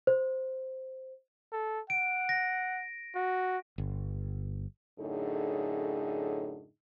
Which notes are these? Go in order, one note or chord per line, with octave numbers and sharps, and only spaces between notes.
C5
A4
F#5 D7
A#6
F#4
G1
F#2 A2 D3 D#4 G#4